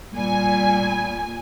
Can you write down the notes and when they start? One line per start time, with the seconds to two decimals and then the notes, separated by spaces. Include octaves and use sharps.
0.14 A#2 G3 G#5